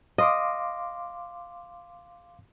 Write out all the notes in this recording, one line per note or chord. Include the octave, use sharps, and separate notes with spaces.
D#5 F5 C6 D6